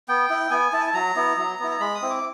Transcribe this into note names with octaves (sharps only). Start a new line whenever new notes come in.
B3 G5
E4
B3 G#5
E4 A5
G#5
A5
F#3 A#5
B3 E4
F#3
B3 E4
A#5
G#3 B5
D#6
C4 E4
D6